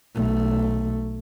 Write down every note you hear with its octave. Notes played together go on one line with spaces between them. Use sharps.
B1 A3